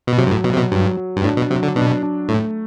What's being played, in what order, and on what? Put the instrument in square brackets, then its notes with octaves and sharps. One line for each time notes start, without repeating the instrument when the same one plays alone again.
[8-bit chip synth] B2
[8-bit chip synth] C3 [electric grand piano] F#3
[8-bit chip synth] G2
A2
[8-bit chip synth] B2 [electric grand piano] F#3
[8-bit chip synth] C3
B2
[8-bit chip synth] G2 [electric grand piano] F#3
[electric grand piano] F#3
[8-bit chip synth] G2
[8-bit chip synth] A2 [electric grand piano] D4
[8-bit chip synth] B2
[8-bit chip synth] C3 [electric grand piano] F#3
[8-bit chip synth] D3
[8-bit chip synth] B2 [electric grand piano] D4
[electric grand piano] D4
[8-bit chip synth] A2 [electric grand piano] A3